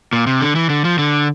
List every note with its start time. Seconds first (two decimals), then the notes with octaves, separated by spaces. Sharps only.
0.13 A#2
0.27 C3
0.41 D3
0.55 E3
0.70 D3
0.85 F3
0.98 D3